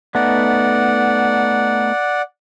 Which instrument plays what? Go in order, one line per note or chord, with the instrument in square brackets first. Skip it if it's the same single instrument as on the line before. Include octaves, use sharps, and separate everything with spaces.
[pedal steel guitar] A3 B3 D#4 [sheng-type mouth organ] D5 F#5